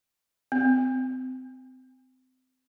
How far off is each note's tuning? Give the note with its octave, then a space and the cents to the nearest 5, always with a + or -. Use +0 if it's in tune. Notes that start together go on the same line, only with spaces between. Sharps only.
C4 -25